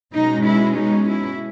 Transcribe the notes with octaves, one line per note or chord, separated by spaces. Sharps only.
B2 G#3 C#4 D#4
E4
D#4
E4